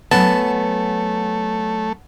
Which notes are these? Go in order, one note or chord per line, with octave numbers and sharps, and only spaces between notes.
F#3 A3 B3 G#5 A5